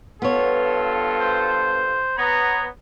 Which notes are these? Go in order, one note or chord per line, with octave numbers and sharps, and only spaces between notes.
G2 B3 F4 A4 C#5
C5
B3 C#5 A#5